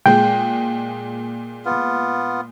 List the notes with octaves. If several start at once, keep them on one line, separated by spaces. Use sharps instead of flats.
A#2 G#3 G5
B3 F4